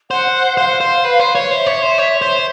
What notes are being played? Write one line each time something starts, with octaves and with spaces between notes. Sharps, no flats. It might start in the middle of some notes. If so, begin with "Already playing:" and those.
C5 F#5
C5 F5
C5
B4
C5
C#5
C5 E5
C#5
C5
C#5
C5